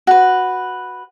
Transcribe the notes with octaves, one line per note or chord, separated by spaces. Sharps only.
F#4 B4